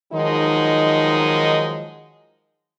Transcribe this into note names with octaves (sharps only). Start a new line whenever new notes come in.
D#3 F3 F#3 G#3 D#4